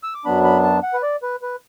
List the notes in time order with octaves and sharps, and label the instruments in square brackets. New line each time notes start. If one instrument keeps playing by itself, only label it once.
[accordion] E6
D6
F#2 F#3 B3 D4 B5
B5
A5
F#5
B4
D5
B4
B4